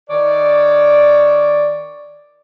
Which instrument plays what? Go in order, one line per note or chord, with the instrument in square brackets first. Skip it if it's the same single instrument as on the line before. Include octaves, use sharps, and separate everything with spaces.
[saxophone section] D#3 C#5 D5